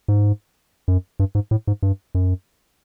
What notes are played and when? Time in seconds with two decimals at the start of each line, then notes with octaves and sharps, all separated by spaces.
0.08 G#2
0.88 F#2
1.20 G2
1.35 G#2
1.51 A2
1.67 G#2
1.83 G2
2.15 F#2